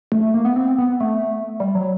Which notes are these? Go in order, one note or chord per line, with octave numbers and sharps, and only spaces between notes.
A3
A3
A#3
B3
C4
B3
A3
G3
F#3